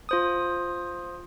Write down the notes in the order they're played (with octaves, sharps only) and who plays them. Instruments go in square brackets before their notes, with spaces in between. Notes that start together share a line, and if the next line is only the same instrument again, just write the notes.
[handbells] F4 C5 D#6